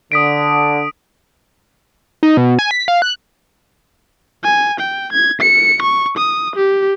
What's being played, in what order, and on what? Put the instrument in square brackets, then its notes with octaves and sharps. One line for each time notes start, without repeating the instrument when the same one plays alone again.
[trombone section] D3 [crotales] D#6 B6 D7
[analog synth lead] D#4
B2
G#5
B6
F5
F#6
[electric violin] G#5
G5
G#6
C#7
C#6
D#6
G4